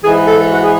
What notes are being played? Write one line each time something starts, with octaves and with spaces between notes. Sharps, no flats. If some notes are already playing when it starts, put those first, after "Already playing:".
G#2 E3 G#4
A4
F#4
G#4